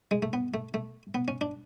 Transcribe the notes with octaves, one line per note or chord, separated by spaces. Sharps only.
G#3
A3
B3
A3
A3
B3
C#4
D4